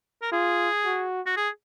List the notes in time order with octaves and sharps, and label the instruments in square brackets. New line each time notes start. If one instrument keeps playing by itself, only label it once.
[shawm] A#4
[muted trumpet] F4 [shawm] G#4
[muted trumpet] F#4
[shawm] F#4
G#4